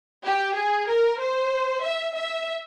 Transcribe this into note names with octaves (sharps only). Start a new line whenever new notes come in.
G4
G#4
A#4
C5
E5
E5